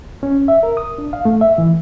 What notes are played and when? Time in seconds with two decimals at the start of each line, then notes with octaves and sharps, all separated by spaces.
0.23 C#4
0.48 E5
0.63 A#4
0.77 D#6
0.98 D4
1.13 F5
1.25 A3
1.41 E5
1.58 E3